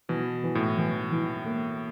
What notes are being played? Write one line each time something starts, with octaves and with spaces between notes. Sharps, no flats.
B2 E3
E3
A2
E3
E3
A#3